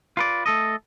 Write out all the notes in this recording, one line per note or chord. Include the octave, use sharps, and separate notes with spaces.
F4 B4 D5
A3 A4 D#5